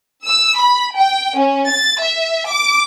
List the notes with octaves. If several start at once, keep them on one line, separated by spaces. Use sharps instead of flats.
E6
B5
G5
C#4
A6
E5
D6